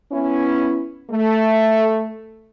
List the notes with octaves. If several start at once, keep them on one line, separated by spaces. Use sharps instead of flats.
B3 C#4 E4
A3